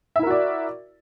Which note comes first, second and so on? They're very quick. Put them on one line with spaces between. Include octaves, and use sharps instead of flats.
E5 E4 A#4 F#4 D5